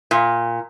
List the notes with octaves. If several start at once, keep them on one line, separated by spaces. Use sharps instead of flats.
A#2